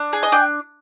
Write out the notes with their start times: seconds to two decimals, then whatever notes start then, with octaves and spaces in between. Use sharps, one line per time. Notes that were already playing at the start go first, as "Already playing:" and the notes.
Already playing: D4
0.13 G#4
0.23 D#5
0.32 D4 G5